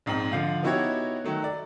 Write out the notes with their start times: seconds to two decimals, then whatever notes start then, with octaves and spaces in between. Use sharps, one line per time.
0.06 A#1 G#2 C4 F#7
0.32 D3 F3 F5
0.63 B3 D#4 E4 F#4 G4 C#5
1.24 D#3 F#3 A3
1.44 D5